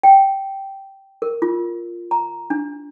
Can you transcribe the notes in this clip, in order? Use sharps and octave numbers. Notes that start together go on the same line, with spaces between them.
G5
A#4
F4
A#5
D4